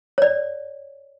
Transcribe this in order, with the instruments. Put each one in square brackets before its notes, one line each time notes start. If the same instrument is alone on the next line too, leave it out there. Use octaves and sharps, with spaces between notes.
[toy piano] C#5 D5